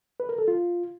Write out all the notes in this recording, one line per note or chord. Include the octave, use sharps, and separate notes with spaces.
B4
A#4
A4
F4